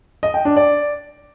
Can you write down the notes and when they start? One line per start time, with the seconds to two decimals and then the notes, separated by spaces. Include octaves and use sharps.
0.23 D#5
0.34 G5
0.45 D4
0.56 D5